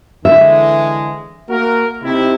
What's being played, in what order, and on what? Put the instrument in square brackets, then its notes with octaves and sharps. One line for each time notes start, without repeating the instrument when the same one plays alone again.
[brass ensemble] D3 E3 G#3 [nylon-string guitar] E5
[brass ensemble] A#3 F#4 A#4
C3 D#4 E4